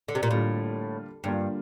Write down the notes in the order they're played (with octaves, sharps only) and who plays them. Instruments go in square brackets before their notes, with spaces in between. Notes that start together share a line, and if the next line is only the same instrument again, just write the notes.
[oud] D3
C3
A#2
[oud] A2 [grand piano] D3 G3 A#3 F4
[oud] G2 [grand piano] D3 G3 A#3 F4